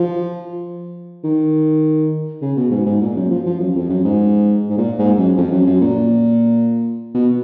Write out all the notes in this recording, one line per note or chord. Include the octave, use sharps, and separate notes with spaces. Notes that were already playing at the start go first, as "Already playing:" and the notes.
Already playing: F3
D#3
C#3
B2
G#2
G#2
A#2
F#2
F3
F3
F#2
F2
F#2
G#2
G#2
A#2
G#2
F#2
F2
F#2
F#2
A#2
B2